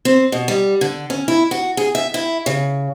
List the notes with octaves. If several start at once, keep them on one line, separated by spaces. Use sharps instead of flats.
C4
B2
G3
D3
C#4
E4
F#4
G#4
E5
E4
C#3